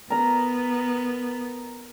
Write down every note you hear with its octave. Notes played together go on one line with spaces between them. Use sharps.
B3 A#4 A#5